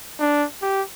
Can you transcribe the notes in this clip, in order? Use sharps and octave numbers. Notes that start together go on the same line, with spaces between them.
D4
G4